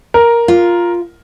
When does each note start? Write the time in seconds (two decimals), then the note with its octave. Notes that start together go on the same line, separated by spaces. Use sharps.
0.14 A#4
0.48 F4